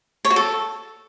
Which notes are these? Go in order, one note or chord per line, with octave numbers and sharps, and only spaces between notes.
C#5
F#4
A4